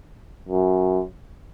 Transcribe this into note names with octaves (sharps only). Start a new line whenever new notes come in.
F#2